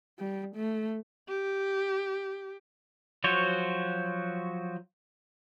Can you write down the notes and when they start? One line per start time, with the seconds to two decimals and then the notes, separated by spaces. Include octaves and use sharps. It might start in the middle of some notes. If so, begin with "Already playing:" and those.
0.19 G3
0.55 A3
1.28 G4
3.24 F3 F#3 F#4 C5 C#5